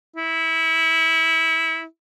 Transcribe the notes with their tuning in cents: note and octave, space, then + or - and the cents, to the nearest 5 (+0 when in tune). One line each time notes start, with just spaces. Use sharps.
E4 -20